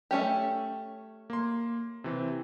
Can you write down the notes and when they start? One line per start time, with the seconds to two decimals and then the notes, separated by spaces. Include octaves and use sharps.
0.11 A3 C#4 G4
1.30 A#3 C6
2.04 C3 E3 C4